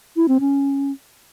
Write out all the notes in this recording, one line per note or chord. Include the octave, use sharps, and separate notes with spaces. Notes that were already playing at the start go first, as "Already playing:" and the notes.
E4
C4
C#4